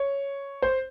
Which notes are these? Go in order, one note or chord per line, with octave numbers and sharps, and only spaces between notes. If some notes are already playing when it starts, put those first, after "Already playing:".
Already playing: C#5
C5